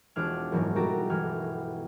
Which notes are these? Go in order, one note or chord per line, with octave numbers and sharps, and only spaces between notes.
E1 D4 F4 D6 F6 G#6
F#1 G#2 E3 C#4 A#4
B1 G3 F#4 G4 A#5
G1 E3 G4 F6 G#6